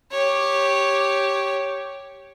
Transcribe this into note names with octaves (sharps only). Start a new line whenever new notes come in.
G4 C#5